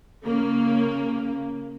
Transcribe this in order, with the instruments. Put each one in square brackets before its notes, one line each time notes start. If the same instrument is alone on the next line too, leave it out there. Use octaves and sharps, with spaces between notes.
[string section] C#3 A#3